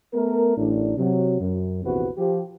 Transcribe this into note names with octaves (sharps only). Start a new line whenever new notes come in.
A3 B3 A#4
A1 A2 D4
C3 F#3
F#2
A#1 E2 C3 F#4 B4
F3 G4